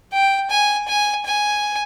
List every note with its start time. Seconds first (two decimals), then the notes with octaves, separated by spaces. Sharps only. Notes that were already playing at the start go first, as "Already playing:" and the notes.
0.13 G5
0.50 G#5
0.88 G#5
1.25 G#5